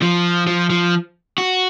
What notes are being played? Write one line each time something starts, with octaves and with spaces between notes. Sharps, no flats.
F3
F3
F3
F#4